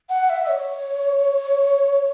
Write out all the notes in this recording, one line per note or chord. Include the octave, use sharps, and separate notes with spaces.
F#5
E5
C#5